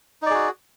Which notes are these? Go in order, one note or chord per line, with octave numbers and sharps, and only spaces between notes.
D#4 F#4 G#4 D5